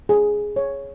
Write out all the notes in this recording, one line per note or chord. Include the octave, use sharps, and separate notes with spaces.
G#4
C#5